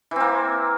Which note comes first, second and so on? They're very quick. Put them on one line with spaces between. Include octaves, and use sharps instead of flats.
E3 C4 A#3